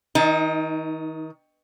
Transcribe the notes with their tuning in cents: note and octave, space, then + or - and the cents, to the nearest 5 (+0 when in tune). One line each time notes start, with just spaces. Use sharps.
D#3 +35 D#4 +0